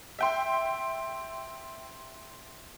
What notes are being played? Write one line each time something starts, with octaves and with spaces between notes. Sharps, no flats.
E5 G5 C6